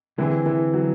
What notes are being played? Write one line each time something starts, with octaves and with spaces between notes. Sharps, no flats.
D3 E3 G3 C4 E4 G#4
E3
F#3